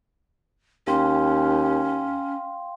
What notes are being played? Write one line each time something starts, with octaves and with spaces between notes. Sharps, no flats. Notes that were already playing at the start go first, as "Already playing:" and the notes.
D#2 C#4 F5 G5 C6